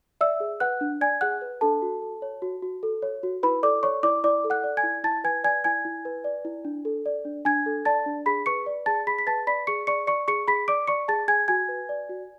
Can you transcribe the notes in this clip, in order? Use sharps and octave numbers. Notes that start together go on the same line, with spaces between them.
D5 E5 E6
G#4
B4 F#5 F#6
D4
D5 G#5 G#6
G#4 F#5 F#6
B4
D4 A4 A5
F#4
A4
C#5
F#4
F#4
A4
C#5
F#4
E4 B4 B5
A4 D5 D6
C#5 D5 C#6
E4 D5 D6
E4 D5 D6
A4
F#5 F#6
D5
G#5 G#6
E4
E4 A5 A6
B4 G#5 G#6
D5 G#5 G#6
E4 G#5 G#6
E4
B4
D5
E4
D4
A4
D5
D4
D4 G#5 G#6
A4
D5 A5 A6
D4
G#4 B5 B6
B4 C#6 C#7
D5
G#4 A5 A6
G#4 B5 B6
B6
B4 A5 A6
D5 B5 B6
G#4 C#6 C#7
D5 C#6 C#7
D5 C#6 C#7
G#4 C#6 C#7
G#4 B5 B6
D5 D6 D7
D5 C#6 C#7
G#4 A5 A6
G#4 G#5 G#6
F#4 G#5 G#6
B4
D5
F#4